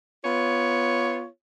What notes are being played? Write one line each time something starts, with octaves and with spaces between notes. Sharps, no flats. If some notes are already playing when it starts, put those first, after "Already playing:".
B3 F4 C#5